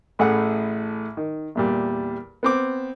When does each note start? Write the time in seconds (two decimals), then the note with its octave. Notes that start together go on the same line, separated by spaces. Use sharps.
0.19 A1 A2 A3 G#4 F#5 B5
1.17 D#3
1.55 E2 A#2 G3
2.43 B3 C4 D6